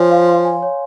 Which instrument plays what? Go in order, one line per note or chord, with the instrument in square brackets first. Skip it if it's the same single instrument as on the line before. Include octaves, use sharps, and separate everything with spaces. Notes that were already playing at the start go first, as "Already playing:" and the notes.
Already playing: [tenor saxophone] F3 [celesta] C#5 F5 G#5 C6
[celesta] F5
C6
G#5
C#5